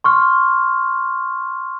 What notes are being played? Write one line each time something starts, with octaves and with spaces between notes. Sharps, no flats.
C6 C#6 F6